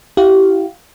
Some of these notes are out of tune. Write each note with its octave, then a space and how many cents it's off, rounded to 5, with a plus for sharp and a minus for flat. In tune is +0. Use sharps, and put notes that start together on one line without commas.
E4 +0 G4 -30 F5 +0